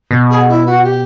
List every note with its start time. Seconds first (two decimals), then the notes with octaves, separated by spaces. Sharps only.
0.11 B2
0.29 G#4
0.48 E4
0.66 F#4
0.83 G4